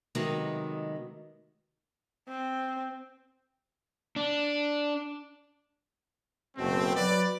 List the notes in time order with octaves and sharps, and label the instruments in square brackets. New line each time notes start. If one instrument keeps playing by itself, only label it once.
[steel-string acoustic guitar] C3 D#3 F#3 G#3 A3 B3
[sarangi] C4
[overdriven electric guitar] D4
[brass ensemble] F#1 B2 A3 C4
F#3 B4 D5